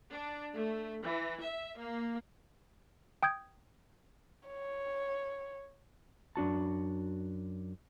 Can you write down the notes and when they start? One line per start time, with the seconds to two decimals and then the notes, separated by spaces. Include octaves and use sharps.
0.11 D4
0.55 A3
1.03 E3
1.41 E5
1.77 A#3
3.23 G5 D#6 G6 G#6
4.48 C#5
6.36 F#2 D4 F#4 A5